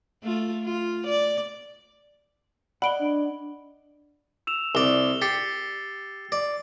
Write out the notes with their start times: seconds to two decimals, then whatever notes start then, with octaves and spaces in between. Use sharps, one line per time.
0.24 A3 F4
0.64 F4
1.07 D5
2.82 D5 D#5 F#5 B5 D7 G7
3.00 D4
4.47 E6 E7 F7
4.75 C2 D5 G7
5.22 G4 A6 C7 C#7
6.32 D5